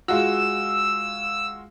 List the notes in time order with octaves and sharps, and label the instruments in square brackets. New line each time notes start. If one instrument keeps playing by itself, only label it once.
[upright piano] G#3 F4 F#4 [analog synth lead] E6